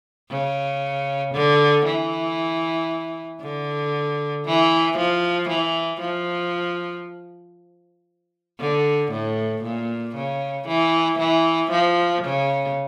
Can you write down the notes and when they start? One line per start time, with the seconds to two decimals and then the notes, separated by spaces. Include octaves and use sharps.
0.30 C#3
1.35 D3
1.86 E3
3.41 D3
4.46 E3
4.98 F3
5.49 E3
6.01 F3
8.60 D3
9.12 A2
9.64 A#2
10.16 C#3
10.68 E3
11.19 E3
11.71 F3
12.24 C#3